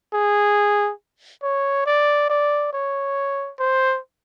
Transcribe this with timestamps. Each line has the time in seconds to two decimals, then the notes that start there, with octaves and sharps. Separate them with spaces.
0.13 G#4
1.43 C#5
1.86 D5
2.29 D5
2.73 C#5
3.59 C5